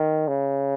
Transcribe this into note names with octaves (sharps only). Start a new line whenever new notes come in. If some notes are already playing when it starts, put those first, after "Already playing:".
Already playing: D#3
C#3